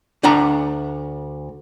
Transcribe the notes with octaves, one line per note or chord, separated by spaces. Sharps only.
D2 D4 F#5 A#5